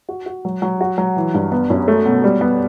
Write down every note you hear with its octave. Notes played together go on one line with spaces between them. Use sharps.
F#4
F#4
F#3
F#3
F#4
F#3
E3
G2
B3
F#2
A3
B2
G3
B3